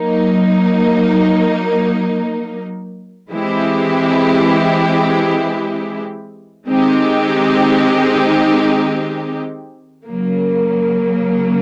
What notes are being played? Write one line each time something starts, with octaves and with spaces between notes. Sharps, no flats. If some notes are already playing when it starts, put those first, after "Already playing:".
Already playing: F#3 A#3 D#4
E3 G#3 C4 E4 G4
D#3 G#3 C4 D#4 G4
C#3 F#3 A#3